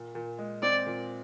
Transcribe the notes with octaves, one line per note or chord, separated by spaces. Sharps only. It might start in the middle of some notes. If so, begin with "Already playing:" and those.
Already playing: A#2
A#2
G#3
C4 D5
A#2